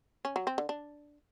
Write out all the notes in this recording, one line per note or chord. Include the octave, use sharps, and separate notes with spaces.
C#4
F#3
C4
D3
D4